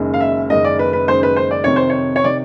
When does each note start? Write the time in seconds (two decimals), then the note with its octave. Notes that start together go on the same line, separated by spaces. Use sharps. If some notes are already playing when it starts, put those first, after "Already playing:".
Already playing: F#1 F#2 D#3 G#3
0.14 F5
0.20 E5
0.50 F#1 F#2 D#3 G#3 D#5
0.65 D5
0.79 B4
0.93 B4
1.08 F#1 F#2 D#3 G#3 C5
1.23 B4
1.36 C5
1.51 D5
1.64 F2 C3 D#3 C#5
1.76 C5
1.90 C#5
2.16 C#5
2.24 C3 D#3 D5